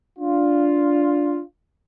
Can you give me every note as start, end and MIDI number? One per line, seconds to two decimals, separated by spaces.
0.19 1.41 62
0.19 1.41 65